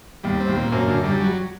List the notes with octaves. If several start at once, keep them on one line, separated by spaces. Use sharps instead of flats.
D#2 D#3 G3
C4
D#2 D#3
A#2
F#2 F#3 A#3
F#2 D3 F#3
F#2 F#3 G3
F#3